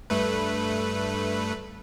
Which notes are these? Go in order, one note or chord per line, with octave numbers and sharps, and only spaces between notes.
G2 A3 B4